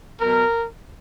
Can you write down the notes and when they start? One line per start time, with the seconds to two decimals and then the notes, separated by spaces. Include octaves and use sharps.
0.20 B2 F#3 A#4